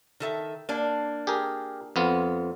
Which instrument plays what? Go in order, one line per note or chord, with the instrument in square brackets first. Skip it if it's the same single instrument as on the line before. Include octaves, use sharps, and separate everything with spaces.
[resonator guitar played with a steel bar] D#3 A4 E5
A#3 D4
[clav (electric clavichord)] G4 G#4 A#4
F2 B3 F4